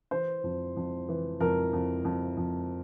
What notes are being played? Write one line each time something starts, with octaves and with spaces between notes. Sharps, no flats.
E3 C5
F2
F2
E3
F2 A#4
F2
F2
F2